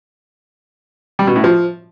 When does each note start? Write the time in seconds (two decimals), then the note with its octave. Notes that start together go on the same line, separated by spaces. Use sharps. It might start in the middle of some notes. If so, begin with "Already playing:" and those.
1.19 G3
1.27 B2
1.36 A2
1.44 F3